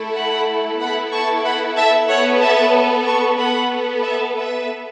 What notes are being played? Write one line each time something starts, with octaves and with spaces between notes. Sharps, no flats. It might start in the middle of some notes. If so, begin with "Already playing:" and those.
Already playing: A3 E4 A4
F#5 B5
B3 E4 A4 F#5 B5
A5 C#6
F#5 B5
E5 A5
B3 A4 C#5 F#5
E5 A5
A5 C#6
B3 A4 F#5 B5
E5 A5
B4 E5